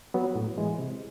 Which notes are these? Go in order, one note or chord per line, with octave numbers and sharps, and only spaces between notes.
F#3 B3
A2
E3 G#3
C3